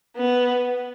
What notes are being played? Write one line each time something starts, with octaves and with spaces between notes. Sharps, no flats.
B3